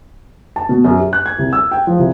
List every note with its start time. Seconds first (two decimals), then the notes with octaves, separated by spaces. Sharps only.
0.56 A5
0.69 B2
0.85 F#2
0.99 G4
1.13 F#6
1.26 G#6
1.38 C2
1.53 E6
1.72 G5
1.87 F3
1.99 C2